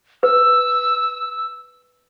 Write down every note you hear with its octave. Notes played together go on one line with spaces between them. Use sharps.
B4 E6